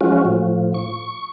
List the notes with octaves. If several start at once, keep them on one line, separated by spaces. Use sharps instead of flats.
F3 F#3 G#3 C#4 F4 F#4
A2 F3
C#6